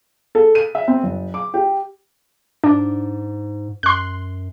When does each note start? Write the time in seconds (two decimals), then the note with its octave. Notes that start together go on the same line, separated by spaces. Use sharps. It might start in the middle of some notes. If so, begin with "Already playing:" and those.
0.35 A4
0.55 D#7
0.75 E5
0.88 C4
1.03 F#1
1.34 D6
1.54 G4
2.64 G#2 D4
3.83 F#2 C6 F#6